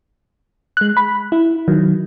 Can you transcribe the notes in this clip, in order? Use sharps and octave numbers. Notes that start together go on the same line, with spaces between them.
G#3 F#6
B5
E4
D#3 F#3